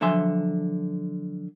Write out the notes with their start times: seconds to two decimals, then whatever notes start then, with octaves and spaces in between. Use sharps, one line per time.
0.01 D3 F3 F#3 E5 G#5 C6